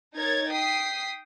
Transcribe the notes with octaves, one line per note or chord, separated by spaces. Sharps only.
D#4 A#4 C#5 G#6 A6
G5 D#6 B6 C7